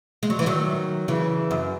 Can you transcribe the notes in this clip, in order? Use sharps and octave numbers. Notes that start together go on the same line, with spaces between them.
G#3
F#3
E3
D#3 F#3
C#3 E3
F#2